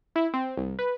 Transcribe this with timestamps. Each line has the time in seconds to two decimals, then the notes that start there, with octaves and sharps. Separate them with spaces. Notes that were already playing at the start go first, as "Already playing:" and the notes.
0.16 E4
0.34 C4
0.57 C2
0.79 B4